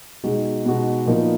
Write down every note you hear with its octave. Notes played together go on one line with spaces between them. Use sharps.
B2 G#3 D#4 F#4
B2 G#3 D#4 F#4
A#2 F3 B3 D#4 A#4